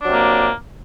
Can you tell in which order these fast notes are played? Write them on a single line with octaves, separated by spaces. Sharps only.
D4 F#3 C3 A#3